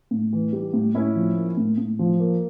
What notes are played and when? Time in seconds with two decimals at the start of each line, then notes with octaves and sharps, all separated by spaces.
0.11 A2
0.33 E3
0.53 G3
0.73 A2
0.94 A2 C#4 E4
1.15 F3
1.36 A#3
1.57 A2
1.78 A2
1.99 F3
2.20 A#3